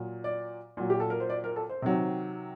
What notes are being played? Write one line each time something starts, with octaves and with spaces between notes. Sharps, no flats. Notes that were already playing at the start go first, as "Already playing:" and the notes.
Already playing: A#2 F#3
D5
A#2 F#3
G4
A4
A#4
C5
D5
A#4
A4
C5
C3 D#3 F#3